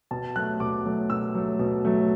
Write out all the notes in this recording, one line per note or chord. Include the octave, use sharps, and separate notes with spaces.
B2 A5
F#3 A3 F#6
B2 D6
F#3 A3
B2 E6
F#3 A3
B2
F#3 A3